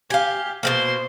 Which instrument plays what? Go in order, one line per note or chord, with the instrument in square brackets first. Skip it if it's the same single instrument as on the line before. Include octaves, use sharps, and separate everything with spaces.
[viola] G4 [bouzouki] F5 G#5
[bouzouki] B2 G#3 A#3 [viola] C5 C6